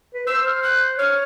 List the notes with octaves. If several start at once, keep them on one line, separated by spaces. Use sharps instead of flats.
B4
C5 E6
F6
F#6
C#5 F6